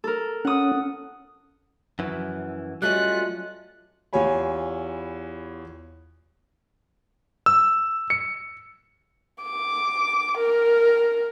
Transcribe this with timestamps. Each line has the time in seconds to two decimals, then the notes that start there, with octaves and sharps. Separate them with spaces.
0.04 A4 A#4
0.45 C#4 F#5 D#6
1.99 F#2 E3 F#3
2.82 G3 A3 C#4 F4 F#4 D#5 F#6
4.13 E2 F4 G4 C#5 G#5 B5
7.46 E6
8.10 C#7
9.43 D6
10.38 A#4